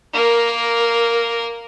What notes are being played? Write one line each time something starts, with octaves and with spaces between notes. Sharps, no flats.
A#3 A#4